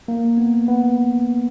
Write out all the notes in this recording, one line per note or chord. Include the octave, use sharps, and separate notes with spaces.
A#3
B3
B3